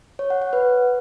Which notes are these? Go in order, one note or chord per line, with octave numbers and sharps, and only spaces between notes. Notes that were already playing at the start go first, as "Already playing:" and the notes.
C#5
F#5
F#5
B4